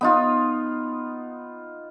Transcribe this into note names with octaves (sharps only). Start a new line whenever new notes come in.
B3 D#4 F4